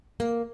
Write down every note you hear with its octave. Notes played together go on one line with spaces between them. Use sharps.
A#3